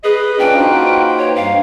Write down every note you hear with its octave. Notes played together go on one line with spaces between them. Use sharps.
G#4 B4 D#5
A#3 C#4 D4 F4 B4 G5
D#4 F#4 C5
C#5
G2 F5